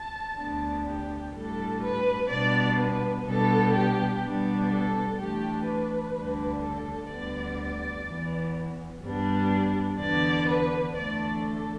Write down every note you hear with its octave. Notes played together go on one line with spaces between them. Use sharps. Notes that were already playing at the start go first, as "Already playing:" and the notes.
Already playing: A5
D2 D3 B3 D4
G4
A2 G3 D4 A4
B4
B2 G3 B3 D4 D5
B4
B2 G3 B3 D4 A4
G4
B2 G3 B3 D4
A4
E2 E3 A3 D4 G4
B4
D2 D3 G3 D4
A4
D2 D3 G3 B3 D5
E2 E3 B3
G2 G3 B3 D4
E2 D3 B3 D4 D5
B4
E2 D3 A3 D4 D5
A4